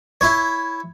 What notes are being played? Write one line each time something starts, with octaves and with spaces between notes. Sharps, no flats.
E4 C#5